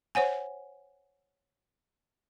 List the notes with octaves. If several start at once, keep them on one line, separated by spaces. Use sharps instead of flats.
C5 C#5 F#5 G#5